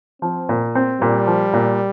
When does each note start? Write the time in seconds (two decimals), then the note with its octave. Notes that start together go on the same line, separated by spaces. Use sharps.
0.22 F3 C4
0.49 A#2
0.75 C4
1.01 A#2 G3
1.27 F3
1.53 A#2